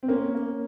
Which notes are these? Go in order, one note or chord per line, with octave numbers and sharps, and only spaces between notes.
C4
A#3 C#4
A#3